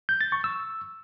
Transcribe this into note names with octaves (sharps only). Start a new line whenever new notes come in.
G6
A6
C#6
E6